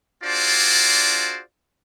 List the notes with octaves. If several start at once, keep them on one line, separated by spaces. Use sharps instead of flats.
D4 F4 F#4 G#4 C5 D5